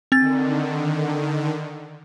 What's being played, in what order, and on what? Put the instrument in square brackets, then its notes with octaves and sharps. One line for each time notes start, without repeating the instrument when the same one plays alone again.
[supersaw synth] D3 D#3 [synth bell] C4 A6